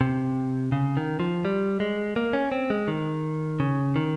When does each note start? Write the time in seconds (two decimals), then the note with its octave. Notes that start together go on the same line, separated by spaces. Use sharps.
0.01 C3
0.72 C#3
0.97 D#3
1.20 F3
1.45 G3
1.80 G#3
2.16 A#3
2.33 C#4
2.52 C4
2.70 G#3
2.88 D#3
3.60 C#3
3.96 D#3